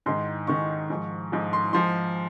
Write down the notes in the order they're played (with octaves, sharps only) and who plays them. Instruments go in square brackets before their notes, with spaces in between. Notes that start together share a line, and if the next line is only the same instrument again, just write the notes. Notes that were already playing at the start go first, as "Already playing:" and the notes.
[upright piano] G#2 D#3 C6
G#2 D#3 C#6
G#2 F3
G#2 F3
C6
G#2 F3 C6